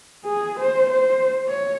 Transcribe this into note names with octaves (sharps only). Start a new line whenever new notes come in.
G#4
C5
C5
C#5